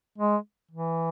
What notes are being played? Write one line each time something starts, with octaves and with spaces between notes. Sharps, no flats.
G#3
E3